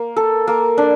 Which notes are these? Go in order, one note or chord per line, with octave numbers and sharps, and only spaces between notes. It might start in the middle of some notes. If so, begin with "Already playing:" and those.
Already playing: A#3
A4
A#3
D4